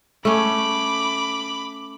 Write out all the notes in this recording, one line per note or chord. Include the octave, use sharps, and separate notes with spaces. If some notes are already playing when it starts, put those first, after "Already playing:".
A3 C#4 B5 D6